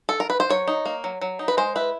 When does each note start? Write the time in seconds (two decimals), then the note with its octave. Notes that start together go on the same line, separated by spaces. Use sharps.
0.09 A4
0.20 A#4
0.30 B4
0.40 C5
0.50 F#3 C#5
0.68 D#4
0.85 A#3
1.04 F#3
1.21 F#3
1.39 D#4
1.48 B4
1.57 G#3 C5
1.76 E4 B4